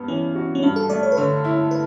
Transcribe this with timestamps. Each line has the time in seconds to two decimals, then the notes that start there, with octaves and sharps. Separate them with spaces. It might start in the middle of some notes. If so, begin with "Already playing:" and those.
Already playing: G2 B3
0.08 E3 C#4
0.35 F#4
0.55 C#4
0.63 G2 D4
0.76 A4
0.90 A3 D5
1.03 C#5
1.12 B4
1.17 D3 C#5
1.44 E4
1.71 B4